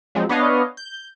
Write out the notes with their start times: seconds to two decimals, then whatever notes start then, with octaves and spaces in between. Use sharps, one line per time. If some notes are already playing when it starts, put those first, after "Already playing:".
0.15 F3 F#3 G#3 C4
0.29 B3 D4 B4 C#5 D#5 F5
0.77 G6